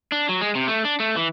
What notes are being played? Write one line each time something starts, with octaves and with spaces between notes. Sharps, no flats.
D4
F#3
G#3
C3
A3
D4
A3
E3